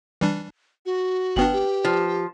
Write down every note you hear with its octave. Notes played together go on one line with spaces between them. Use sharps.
E3 G3 D4
F#4
G1 B3 D4 B4 G5 F#7
G4
F3